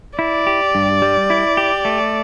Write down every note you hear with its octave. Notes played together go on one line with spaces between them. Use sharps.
E4 D5
G4
G2
G3
E4
G4
A3